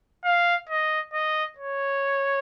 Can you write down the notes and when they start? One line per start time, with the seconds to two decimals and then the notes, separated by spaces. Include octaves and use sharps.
0.25 F5
0.69 D#5
1.13 D#5
1.58 C#5